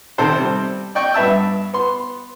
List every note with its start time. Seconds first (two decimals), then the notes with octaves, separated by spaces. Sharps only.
0.18 C3 D#3 A4 C5 A5
0.36 G3 C4
0.95 D5 D#5 G5 C#6
1.14 G2 B3 E5 A5 E6
1.73 B3 C6